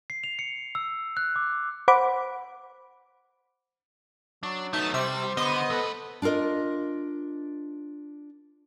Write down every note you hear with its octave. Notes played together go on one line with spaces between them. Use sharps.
C7
F7
C#7
E6
F#6
D6
C5 F#5 B5 D6
F#3 D4
A3 B3 D#4 E5 A5
C3 G3 C5 E6
D3 B3 D#5
A3 A4 B4
D4 F4 F#4 A#4 D#5